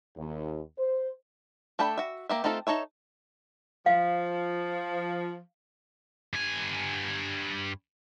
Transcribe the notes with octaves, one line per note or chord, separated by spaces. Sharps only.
D#2
C5
A3 D4 A4 G5 B5
F#4 E5
A#3 G4 E5
A3 C4 D#4 F4 A4
D#4 A4 C#5 E5
F3 F5
G2 G#5